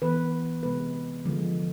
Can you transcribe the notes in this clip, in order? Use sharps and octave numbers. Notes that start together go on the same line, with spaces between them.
E3 B3 B4
C3 G#3 B3 B4
D3 F3 G#3